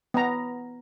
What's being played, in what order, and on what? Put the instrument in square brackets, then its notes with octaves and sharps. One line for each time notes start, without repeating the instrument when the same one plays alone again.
[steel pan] B3 A#5